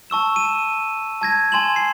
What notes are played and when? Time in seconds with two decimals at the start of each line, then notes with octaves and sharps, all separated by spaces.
0.10 A5 C#6 E6 E7
0.36 D#7 E7
1.21 A5 G#6 A#6
1.52 G#5 C6 E7 F#7
1.76 C7